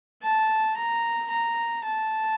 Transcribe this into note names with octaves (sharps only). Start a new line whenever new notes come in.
A5
A#5
A#5
A5